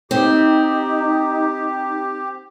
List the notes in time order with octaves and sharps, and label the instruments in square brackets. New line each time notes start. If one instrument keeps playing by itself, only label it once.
[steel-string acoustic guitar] C4 [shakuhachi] D#4 [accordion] G4